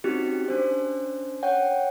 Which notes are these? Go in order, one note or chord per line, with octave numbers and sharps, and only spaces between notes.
C4 C#4 D#4 F#4 G4
C#4 D4 C5
C#5 F#5 G5